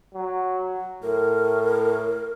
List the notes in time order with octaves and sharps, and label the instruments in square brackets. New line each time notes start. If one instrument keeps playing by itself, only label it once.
[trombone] F#3
[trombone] A2 [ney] A#4